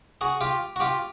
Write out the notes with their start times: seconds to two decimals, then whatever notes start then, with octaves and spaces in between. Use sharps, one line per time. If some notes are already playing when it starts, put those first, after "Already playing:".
0.21 F#4 G#4
0.41 F4 G4
0.76 F#4
0.80 F4 G4